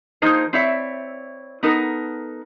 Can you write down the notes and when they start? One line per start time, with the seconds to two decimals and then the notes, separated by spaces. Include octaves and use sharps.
0.22 F3 A#3 D#4 G#4 C5
0.53 C4 E4 C#5 D5 E5
1.63 B3 D#4 A4 A#4